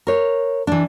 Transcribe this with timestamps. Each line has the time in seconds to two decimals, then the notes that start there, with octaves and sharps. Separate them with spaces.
0.07 A#4 C#5
0.67 E3 D4